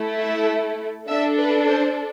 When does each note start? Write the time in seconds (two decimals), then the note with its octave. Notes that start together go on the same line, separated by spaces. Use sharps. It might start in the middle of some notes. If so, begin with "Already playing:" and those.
Already playing: A3 E4 A4
0.19 E5
1.09 D4 A4 E5
1.38 B4
1.69 C5